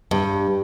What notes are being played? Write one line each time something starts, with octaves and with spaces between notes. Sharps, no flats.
G2